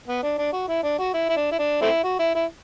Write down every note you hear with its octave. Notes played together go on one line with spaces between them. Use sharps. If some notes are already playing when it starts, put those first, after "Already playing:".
B3
D4
D4
F#4
E4
D4
F#4
E4
E4
D4
E4
D4
A3 C4 E4
F#4
E4
E4